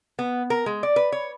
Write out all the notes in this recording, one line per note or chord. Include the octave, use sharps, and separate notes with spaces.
B3
A#4
G#3
D5
B4
C#5